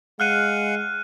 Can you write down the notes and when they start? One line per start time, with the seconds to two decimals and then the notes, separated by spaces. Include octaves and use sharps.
0.20 G#3 F5 F#5 F6 F#6 D#7